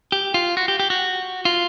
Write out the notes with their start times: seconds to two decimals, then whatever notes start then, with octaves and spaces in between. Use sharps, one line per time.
0.12 G4
0.34 F4
0.57 F#4
0.68 G4
0.80 G4
0.90 F#4
1.45 F4